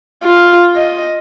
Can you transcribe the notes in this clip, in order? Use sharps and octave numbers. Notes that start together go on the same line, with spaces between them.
F4
D#5